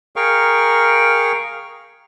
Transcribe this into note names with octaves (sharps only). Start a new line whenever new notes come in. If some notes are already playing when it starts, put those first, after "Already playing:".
G#4 A#4 F5 G5 C#6